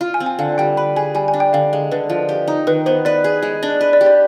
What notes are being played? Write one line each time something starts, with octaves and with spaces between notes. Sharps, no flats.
F4
G#5
C4
G#5
D3 F5
G3 G5
B4 B5
G#4 G#5
G3 G#5
G#5
D4
G5
D3 F5
G#3
D3 B4
F3
G4
D#4
D#3 B4
B3 C5
B4 D5
G#4
G#3
D4
B4
D5
G4
D5